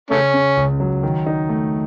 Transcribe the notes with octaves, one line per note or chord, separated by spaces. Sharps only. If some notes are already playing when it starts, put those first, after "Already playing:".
C#3 A3 C#4
C#3
C#2
F#3
D#3
D#4
A3